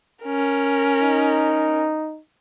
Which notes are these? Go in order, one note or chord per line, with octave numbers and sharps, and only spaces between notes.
C#4 A#4
D#4